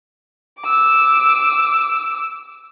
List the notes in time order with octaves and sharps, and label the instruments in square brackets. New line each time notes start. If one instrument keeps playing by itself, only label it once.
[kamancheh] D6 E6